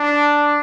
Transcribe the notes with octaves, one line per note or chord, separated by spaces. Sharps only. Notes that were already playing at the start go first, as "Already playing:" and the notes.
Already playing: D4